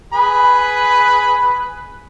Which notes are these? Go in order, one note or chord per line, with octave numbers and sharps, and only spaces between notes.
G#4 B4 B5